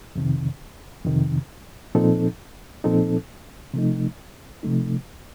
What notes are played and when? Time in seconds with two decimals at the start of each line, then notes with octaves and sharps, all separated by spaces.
0.16 F2 C3 D#3
1.05 F2 C3 D#3
1.95 A#2 F3 C4 D#4 A4
2.84 A#2 F3 C4 D#4 A4
3.74 C3 F3 A3 D#4
4.63 C3 F3 A3 D#4